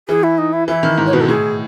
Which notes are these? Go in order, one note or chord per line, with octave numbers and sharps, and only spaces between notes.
E3 G#4
E4
D#4
E4
E3 E4
D#3
G#2
C#5
B2 B4
A4
A2 G#4